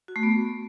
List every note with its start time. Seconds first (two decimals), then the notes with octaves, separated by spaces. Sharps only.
0.08 F#4
0.16 A3
0.23 B3